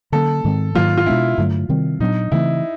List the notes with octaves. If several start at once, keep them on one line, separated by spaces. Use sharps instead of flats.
D3 F#3 A#3 C#4 A4
G#2 D#3 G#3 C4
G#2 D#3 F#3 A#3 F4
F4
B2 G#3 B3 D4 E4
G2 D3 F#3 A3
C3 D#3 G3 C4
A#2 F#3 B3 D4 D#4
C#3 E3 A3 C4 E4